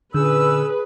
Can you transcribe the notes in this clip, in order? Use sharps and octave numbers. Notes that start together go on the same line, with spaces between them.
A#2 D3 C#4 G#4 B4 E6